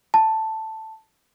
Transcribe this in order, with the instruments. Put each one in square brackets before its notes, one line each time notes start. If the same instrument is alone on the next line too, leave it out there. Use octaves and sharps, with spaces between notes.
[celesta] A5